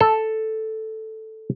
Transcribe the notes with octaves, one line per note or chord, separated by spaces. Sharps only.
A4